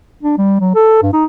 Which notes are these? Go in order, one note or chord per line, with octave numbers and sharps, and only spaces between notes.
D4
G3
F#3
A4
G2
D#4